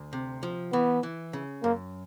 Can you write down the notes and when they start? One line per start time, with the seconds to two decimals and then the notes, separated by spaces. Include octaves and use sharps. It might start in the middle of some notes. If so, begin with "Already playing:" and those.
Already playing: D2
0.13 C3
0.43 F3
0.73 E3 B3
1.03 E3
1.33 C#3
1.64 F#2 A#3